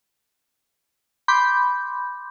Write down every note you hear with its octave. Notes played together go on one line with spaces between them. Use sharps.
B5 C6 D6 G6